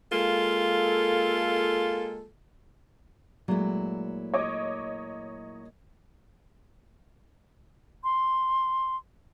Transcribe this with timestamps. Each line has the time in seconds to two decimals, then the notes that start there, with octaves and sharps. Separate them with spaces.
0.12 G#3 A#3 F4 A4
3.48 A#2 F#3 G#3 A3 E4
4.34 C#5 D#5 D6
8.04 C6